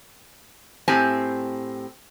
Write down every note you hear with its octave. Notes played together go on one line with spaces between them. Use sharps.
A2 C4 G4 G#5